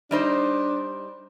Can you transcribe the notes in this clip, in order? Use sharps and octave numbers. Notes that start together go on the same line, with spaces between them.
G3 D4 D#4 C5